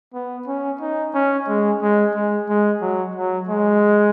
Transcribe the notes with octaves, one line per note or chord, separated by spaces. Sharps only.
B3
C#4
D#4
C#4
G#3
G#3
G#3
G#3
F#3
F#3
G#3